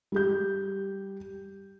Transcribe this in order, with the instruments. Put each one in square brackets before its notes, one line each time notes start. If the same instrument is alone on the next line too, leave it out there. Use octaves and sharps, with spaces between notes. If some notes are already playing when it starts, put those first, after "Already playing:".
[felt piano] G3 G4 G6